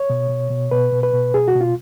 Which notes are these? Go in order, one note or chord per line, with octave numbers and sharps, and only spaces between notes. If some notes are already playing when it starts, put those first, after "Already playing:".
Already playing: C#5
B2
B2
B2
B2 B4
B2
B4
B2
B2 G#4
F#4
B2
F4